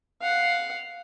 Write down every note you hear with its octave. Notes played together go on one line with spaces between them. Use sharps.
F5 F#5